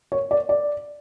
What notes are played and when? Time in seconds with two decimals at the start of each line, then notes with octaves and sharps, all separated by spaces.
0.12 C#5
0.31 D5
0.49 D5